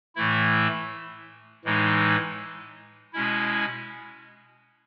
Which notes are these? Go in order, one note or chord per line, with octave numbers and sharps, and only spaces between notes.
A2 E3 A3 E4
A2 E3 G#3 D#4
B2 G#3 C#4 E4